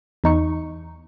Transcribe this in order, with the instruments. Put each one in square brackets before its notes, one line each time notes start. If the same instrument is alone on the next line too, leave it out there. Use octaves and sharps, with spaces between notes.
[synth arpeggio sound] E2 D#4 C#6